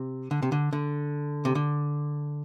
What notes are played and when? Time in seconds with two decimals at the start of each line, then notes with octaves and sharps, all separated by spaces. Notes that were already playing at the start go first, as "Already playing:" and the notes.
Already playing: C3
0.31 D3
0.42 C3
0.52 D3
0.73 D3
1.45 C3
1.55 D3